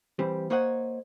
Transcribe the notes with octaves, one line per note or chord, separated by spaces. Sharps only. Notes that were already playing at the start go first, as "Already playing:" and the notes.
E3 G3 C4 G4
A#3 C5 C#5 D#5 F#5